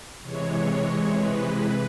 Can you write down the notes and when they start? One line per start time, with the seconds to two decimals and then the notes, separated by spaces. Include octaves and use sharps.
0.23 C3 E3 G#3 C#5
1.12 B4
1.55 B4